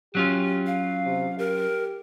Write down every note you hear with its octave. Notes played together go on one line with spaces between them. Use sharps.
F#3 C#4 F4 G4
F5
C3
G4 A#4